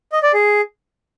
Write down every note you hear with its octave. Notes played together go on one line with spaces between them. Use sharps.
D#5
D5
G#4